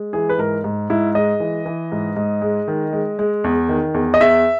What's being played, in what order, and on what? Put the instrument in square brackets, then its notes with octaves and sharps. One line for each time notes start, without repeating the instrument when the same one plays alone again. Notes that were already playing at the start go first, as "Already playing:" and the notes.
Already playing: [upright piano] G#3
E3 G#4
B4
G#2 A#4
G#2
G#2 E4
G#3 D#5
E3
E3
G#2
G#2
G#3
D#3
G#3
G#3
E2
D#3
E2
D#5
E2 E5